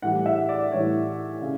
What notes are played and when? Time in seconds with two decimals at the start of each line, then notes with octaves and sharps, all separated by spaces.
0.02 A2 E3 G3 F#5
0.26 E5
0.49 D5
0.72 A2 E3 G3 C#5
1.42 C#3